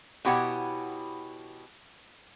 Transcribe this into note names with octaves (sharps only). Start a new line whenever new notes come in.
B2 E4 G4 C#5 F#5 G#5